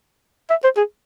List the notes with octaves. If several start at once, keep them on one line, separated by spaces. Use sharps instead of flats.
E5
C5
G#4